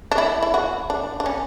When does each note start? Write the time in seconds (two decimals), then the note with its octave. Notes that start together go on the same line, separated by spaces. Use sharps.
0.12 D4
0.18 E4
0.42 E4
0.54 F#4
0.90 D4
1.20 D4
1.26 C#4